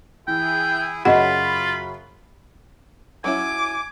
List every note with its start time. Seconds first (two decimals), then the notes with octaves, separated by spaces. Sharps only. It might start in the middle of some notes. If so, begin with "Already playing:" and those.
0.28 E3 E4 G#4 G5
1.05 F#2 C#3 F4 F#4 D#5 F#5 B5
3.24 F#3 C#4 E4 G#5 D6